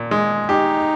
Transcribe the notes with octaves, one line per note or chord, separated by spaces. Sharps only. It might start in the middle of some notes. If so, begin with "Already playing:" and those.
Already playing: A#2
G#3
D#4 G4